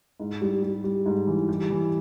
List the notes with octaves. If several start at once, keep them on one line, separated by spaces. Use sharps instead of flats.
G#2
G3
G3
G3
G#2
E3
G3
E3